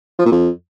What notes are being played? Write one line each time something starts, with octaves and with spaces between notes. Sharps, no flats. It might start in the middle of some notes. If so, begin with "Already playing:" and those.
F3
A#2
F2